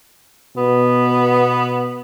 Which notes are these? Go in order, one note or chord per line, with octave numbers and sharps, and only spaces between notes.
B2 B3